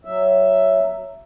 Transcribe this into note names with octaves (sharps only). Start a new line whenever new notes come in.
F#3 E5